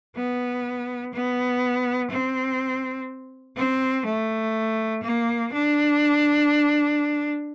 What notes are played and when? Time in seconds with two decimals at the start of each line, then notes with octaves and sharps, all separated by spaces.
0.16 B3
1.14 B3
2.11 C4
3.57 C4
4.06 A3
5.03 A#3
5.53 D4